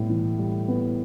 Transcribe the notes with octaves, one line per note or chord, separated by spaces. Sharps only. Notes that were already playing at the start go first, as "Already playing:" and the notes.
Already playing: A2 G3 B3
E3
G3
B3